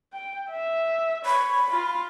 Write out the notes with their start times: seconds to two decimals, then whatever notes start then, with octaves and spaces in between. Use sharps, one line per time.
0.13 G5
0.51 E5
1.25 C#5 B5
1.71 F4